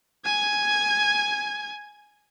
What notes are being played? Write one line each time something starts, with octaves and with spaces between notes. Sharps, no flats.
G#5 G#6